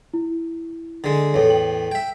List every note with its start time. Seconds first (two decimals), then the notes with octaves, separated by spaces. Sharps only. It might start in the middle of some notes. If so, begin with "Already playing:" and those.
0.14 E4
1.04 D3 G#3
1.34 E2 A2 G#4 A4 C#5
1.50 G5 F#7
1.92 E5 G5